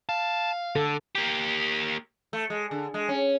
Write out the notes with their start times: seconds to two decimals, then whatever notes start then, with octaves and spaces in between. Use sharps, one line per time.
0.09 F5 A5
0.76 D3 A4
1.15 A#3 G4
2.33 A3
2.50 G#3
2.71 D3
2.94 G#3
3.09 C#4